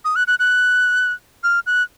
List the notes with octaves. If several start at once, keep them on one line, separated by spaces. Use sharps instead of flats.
D#6
F#6
F#6
F#6
F6
F#6